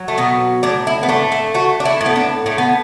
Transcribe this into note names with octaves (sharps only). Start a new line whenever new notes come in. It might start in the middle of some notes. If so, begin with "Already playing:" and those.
Already playing: F#3
A3
B2 B3
A2 D4
E4
B3
A3 D4
E4
A3 F#4
D4
E4
A2
B3
D4
A2 A3
B3